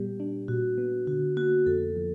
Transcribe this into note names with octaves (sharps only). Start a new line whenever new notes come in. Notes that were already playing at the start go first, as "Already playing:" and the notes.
Already playing: A#2 G3 B3 G4
D4
A#2 F#4
B3
D3 F#4
A#3 F#4
F2 A4
F3